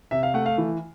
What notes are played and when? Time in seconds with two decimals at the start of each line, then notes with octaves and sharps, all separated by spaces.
0.11 C3 E5
0.23 F5
0.34 A3 F#5
0.46 F5
0.58 E3